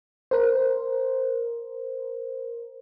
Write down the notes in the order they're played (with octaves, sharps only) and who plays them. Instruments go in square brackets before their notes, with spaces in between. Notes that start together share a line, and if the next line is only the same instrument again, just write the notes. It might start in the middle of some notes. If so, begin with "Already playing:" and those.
[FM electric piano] A#4 C5